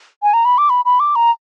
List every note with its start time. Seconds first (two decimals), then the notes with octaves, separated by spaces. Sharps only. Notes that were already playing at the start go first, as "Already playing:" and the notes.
0.23 G#5
0.34 A#5
0.45 B5
0.58 D6
0.70 B5
0.85 B5
1.00 D6
1.16 A#5